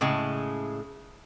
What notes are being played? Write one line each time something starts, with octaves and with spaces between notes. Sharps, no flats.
A2 C#3 G#3